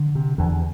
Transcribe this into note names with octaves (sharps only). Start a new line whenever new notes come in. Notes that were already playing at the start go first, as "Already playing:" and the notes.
Already playing: D3
C3
E2 D3